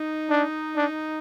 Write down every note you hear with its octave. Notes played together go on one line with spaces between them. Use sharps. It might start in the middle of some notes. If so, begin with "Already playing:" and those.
Already playing: D#4
D4
D4